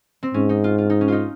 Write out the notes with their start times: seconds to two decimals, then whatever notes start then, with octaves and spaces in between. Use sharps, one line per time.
0.23 C4
0.34 G#2 C#4
0.49 D#4
0.64 F4
0.78 F4
0.90 D#4
1.01 C#4
1.08 D#4 F4